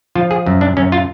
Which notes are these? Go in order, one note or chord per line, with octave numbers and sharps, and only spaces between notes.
F3 F4
G#4
F#2
D4
F#2 C#4
F4